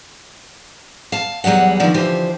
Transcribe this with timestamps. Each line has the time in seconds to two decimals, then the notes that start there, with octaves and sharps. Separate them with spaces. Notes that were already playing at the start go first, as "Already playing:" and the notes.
1.12 F5 A5
1.44 E2 F#3 G3 G#4 F#5
1.80 D3 D#3 F3 B3 D4
1.94 D3 E3 F3 G4 C5